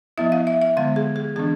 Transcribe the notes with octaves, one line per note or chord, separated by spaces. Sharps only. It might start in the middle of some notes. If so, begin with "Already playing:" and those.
F3 B3 E4 E5
F5
E5
E5
D3 G#3 B3 F5
G#4
G#4
E3 B3 D4 G#4